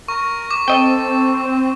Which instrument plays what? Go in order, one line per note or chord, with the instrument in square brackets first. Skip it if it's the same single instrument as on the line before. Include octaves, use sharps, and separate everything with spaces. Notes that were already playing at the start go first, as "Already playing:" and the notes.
[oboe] A#4 [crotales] C#6
[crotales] D6
[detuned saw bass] C4 [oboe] A4 [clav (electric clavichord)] D#5 G5